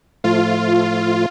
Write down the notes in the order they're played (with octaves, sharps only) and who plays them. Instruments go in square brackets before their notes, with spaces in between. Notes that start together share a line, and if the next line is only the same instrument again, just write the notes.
[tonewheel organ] A2 F3 A3 [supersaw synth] F4